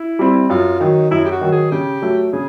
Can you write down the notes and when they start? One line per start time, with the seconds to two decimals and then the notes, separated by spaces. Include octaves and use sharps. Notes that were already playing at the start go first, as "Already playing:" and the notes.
Already playing: E4
0.19 G3 C4
0.50 F#2 F4
0.80 D#3 F#3 D#4
1.11 F#2 E4
1.25 G4
1.31 F#4
1.41 D#3 F#3
1.52 G#4
1.71 C#3 G4
2.02 F#3 A3
2.33 C#3 G#4